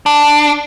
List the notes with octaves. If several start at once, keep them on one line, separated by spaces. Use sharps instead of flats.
D4